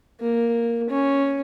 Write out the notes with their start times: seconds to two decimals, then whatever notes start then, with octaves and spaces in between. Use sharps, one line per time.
0.20 A#3
0.89 C#4